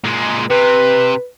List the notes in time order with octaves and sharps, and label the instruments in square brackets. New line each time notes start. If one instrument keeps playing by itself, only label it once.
[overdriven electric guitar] A#2 G#3
[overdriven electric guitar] C3 [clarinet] B4